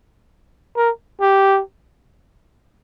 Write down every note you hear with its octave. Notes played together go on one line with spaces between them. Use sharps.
A#4
G4